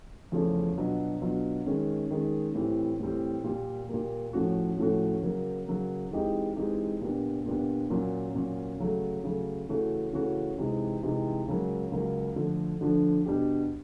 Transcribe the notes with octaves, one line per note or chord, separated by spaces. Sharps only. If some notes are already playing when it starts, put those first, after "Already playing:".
E2 C#3 F3 A3 C#4
B2 F#3 B3 D4 F4
B2 F#3 B3 D4 F4
D#3 G#3 C#4
D#3 G#3 C#4
A2 E3 G3 C4
A2 E3 G3 C4
A#2 G3 A#3
A#2 G3 A#3
A2 F3 A3 C#4 F#4
A2 F3 A3 C#4 F#4
C#3 F#3 A#3
C#3 F#3 A#3
E3 G#3 C4 D#4 G4
E3 G#3 C4 D#4 G4
A#2 G3 B3 D4
A#2 G3 B3 D4
A#2 F#3 A#3 C#4
A#2 F#3 A#3 C#4
C#3 F#3 A3
C#3 F#3 A3
C#3 E3 A3 C#4 F#4
C#3 E3 A3 C#4 F#4
C3 E3 G#3 C4 D#4
C3 E3 G#3 C4 D#4
C#2 C#3 F#3 A#3
C#2 C#3 F#3 A#3
D3 F3 A3 D4
D3 F3 A3 D4
B2 G3 B3 D4 G4